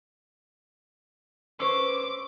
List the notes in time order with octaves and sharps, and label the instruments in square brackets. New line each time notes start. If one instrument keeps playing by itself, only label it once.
[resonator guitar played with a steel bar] C#4 C5 [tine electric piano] B4 C#6 E6 [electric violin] D6